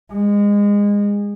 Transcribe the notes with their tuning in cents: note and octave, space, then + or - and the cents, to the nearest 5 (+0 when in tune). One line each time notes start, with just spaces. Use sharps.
G#3 -25